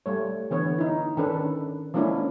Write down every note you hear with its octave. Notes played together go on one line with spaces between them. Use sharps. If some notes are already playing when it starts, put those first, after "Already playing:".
G3 A3 C#5
D3 E3 B3 C#5
D#4 E4
D#3 C#4 D4 A4 B4
F3 G#3 A#3 C#4 D4 E4